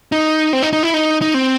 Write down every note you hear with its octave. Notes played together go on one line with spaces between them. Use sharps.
D#4
C4
D#4
D#4
E4
D#4
D#4
C4